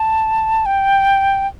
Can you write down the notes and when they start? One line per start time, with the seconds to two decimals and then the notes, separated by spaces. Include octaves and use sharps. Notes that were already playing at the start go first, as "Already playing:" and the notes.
Already playing: A5
0.66 G5